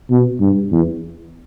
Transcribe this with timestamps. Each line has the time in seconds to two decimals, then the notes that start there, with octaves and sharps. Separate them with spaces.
0.10 B2
0.41 G2
0.72 E2